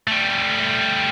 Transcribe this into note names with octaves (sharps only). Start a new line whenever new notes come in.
G3 A3